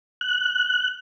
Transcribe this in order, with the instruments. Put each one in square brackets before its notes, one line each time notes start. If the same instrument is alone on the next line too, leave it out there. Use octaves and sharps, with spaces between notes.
[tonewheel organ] F#6